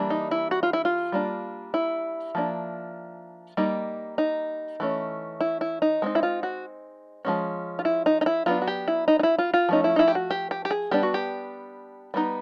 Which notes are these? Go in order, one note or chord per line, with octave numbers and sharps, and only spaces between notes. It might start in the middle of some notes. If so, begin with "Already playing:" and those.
Already playing: E3 G3 A#3 D4
D#4
E4
F#4
F4
E4
F4
G3 A#3 D4
E4
F3 A#3 D4
G3 A#3 D#4
D#4
E3 A3 C#4
E4
E4
D#4
G#3 C4 D#4
E4
F4
F#4
F3 G#3 C#4
F4
E4
D#4
D#4
E4
F#3 B3 D4 F4
F#4
G4
E4
D#4
D#4
E4
F4
F4
F3 A3 C#4 D#4
E4
D#4
E4
G4
F#4
G4
G4
G4
G#4
G3 B3 D4 G4
F#4
G4
G3 B3 D#4